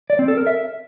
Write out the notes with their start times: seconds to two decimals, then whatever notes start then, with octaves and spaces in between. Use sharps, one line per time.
0.10 D5
0.19 C4
0.28 A4
0.37 A#4
0.47 E5